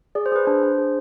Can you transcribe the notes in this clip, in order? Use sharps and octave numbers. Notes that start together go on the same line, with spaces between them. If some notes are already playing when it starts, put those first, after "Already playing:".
G#4 D5
C5
G#4 B4
D4 C5
D4
G#4